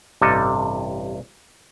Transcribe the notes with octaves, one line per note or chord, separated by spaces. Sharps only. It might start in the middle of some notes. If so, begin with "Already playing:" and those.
A1 G2 C3 G3 A4 D#5